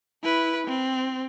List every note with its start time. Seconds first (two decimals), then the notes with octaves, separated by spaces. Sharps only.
0.23 E4 B4
0.67 C4